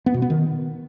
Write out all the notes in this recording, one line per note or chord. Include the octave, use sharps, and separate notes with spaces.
B3
B2
B3
D#3